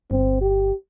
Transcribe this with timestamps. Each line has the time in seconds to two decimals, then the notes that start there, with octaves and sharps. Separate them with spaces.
0.11 G1 C4
0.41 G4